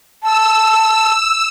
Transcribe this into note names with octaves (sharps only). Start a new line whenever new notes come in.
A5 E6